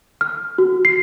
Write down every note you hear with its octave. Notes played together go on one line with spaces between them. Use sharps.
F6
F#4
C7